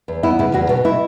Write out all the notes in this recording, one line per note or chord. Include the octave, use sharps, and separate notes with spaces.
E2
B3 E4
C#3 E4
E2 F#4
B2 F#4
B2 E4